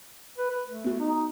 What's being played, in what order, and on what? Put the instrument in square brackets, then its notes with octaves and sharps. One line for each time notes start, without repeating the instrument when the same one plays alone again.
[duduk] B4
B4
A3
[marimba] B3 F#4
[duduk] D#4